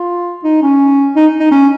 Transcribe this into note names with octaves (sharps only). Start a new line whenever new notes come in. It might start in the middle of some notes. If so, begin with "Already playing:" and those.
Already playing: F4
D#4
C#4
D#4
D#4
C#4